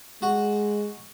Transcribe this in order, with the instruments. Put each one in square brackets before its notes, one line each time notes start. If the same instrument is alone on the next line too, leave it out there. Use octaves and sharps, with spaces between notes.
[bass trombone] G#3 [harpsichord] F#4